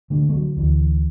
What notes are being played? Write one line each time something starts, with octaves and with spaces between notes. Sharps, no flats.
D3 A3
A3
F#3
D2 E3